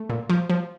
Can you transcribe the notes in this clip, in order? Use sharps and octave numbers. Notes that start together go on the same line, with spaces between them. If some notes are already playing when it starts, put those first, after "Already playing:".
Already playing: A3
A#2
F3
F3